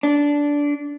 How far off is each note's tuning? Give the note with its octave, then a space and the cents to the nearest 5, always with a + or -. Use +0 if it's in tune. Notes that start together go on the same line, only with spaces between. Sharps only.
D4 -15